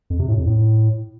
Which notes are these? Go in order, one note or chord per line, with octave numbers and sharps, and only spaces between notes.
F2
C3
A2
F2
A2